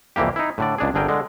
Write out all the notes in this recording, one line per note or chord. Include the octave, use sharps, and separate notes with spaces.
C2 F2 E3 A#3 G4
D#4 E4
A2 D3 D5
C#2 D4 G#4
G1 D3 G#4 A#4 G5
D3 G#3